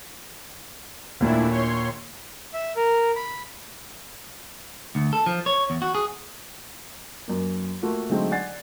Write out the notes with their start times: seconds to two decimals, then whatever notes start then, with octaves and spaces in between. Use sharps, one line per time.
1.20 D#2 A#2 A3 D4 E4
1.50 C#5 C6
2.54 E5
2.76 A#4
3.16 B5
4.95 D2
5.13 A4
5.26 F3
5.46 C#5
5.70 E2
5.82 F#4
5.95 G#4
7.28 F#2 A#3
7.82 A3 A#3 F4 F#4
8.10 D3 F#3 G#3 A3 C4 D#4
8.32 D5 F#5 G#5 A6 C7